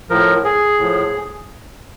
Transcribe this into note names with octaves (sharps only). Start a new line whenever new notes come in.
A2 F3 A#4
G#4
A2 F3